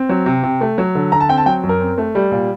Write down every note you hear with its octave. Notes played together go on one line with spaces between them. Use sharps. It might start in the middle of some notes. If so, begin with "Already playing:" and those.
Already playing: C4
F#3
C3
C3
A3
F#3
D3
D3 A#5
A5
C4 G5
A5
F#3 G5
F#2
A#4
C4
A3
G3
A#2